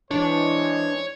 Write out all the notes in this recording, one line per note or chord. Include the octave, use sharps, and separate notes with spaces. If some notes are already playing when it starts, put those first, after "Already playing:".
E3 G#3 D4 C5 C#5